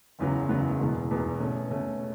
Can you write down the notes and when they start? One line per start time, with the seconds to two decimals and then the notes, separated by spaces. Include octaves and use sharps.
0.19 F#1 E2 C#3 F#3 B3
0.49 F#1 E2 C#3 F#3 B3
0.80 E1 E2 B2
1.11 E1 E2 B2
1.40 B2 A3 C#4
1.71 B2 A3 C#4